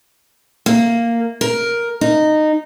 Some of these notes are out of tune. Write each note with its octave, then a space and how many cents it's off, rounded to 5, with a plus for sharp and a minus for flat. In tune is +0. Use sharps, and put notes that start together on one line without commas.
A#3 -5
A#4 +10
D#4 -15